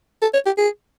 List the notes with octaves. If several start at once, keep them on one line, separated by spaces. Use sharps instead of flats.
A4
C#5
G4
G#4